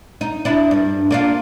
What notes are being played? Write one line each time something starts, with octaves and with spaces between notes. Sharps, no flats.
D#4
D4 E4
G2
A#3 D4 F4